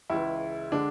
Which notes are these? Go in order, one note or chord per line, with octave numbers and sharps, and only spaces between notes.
C#2 C#3 E3 G#3 E4
D3 G#3 D4